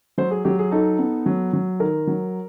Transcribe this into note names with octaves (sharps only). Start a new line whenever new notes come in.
F#3 C5
G#4
F#3 G4
G#4
D#4 A4
B3
F#3
F#3
D#3 A#4
F#3